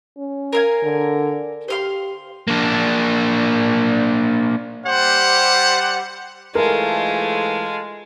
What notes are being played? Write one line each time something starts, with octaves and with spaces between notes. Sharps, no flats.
C#4
A#4 F5 G#5
D3
G4 C5 F5 C6
A#3 D4
G3 G4 C5 F#5
G#2 E3 G#3 A3 F4 A4 A#4 F5